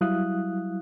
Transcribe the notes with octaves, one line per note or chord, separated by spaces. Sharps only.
F#3 G3 E4 F5 D#6 F#6